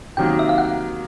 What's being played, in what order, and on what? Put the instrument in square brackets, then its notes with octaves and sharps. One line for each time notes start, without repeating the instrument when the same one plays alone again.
[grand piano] C3 D#3 F#3 A#3 [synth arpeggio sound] G5
[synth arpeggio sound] E5
F5
F#5